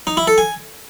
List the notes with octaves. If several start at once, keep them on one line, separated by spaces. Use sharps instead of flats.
D#4
E4
A4
G#5